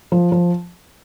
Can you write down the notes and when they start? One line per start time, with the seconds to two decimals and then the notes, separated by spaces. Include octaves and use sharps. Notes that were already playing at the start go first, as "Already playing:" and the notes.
0.12 F3
0.32 F3